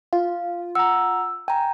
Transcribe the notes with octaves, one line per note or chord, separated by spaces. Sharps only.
F4 F5
F#5 A#5 E6
G5 G#5 A#5